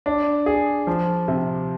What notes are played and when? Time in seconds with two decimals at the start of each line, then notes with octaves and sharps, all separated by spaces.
0.06 D4
0.46 G#4
0.87 F3
1.28 C3